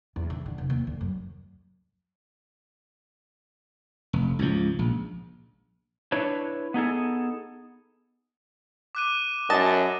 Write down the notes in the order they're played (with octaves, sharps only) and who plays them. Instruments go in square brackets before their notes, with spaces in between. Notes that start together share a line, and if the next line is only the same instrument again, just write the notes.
[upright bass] E2
D#3
D3
F1
D#2
D2
F#2
[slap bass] F1
C#2 G#2 F3
A#1
[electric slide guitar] D4 E4 B4 C#5
B3 D#4 G#4 A4
[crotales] D6 F#6 D#7
[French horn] F#2 [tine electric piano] D#5 [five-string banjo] A5